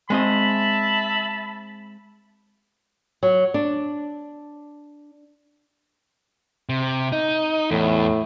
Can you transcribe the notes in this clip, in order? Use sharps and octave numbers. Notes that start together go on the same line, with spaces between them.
G#3 C4 D#5 E5 A5 B5
F#3
D4
C3
D#4
E2 A2